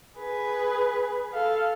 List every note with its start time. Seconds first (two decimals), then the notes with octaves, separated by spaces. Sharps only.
0.19 G#4 B4
1.33 A4 F5